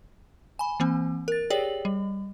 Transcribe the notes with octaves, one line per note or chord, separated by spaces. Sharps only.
G#5 B5
E3 A#3 C4
A#4 A6
G4 G#4 C#5 D5 G5 F#7
G3